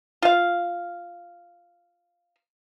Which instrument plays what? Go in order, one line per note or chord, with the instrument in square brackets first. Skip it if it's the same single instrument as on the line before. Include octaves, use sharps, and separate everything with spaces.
[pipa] F4 F5